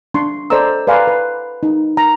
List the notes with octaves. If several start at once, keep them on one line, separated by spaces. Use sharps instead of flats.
D4 C6 C#6
A4 C5 D5 D#5 A#5 E6
B4 D5 F5 G#5 A#5 C6
B4
D#4
A#5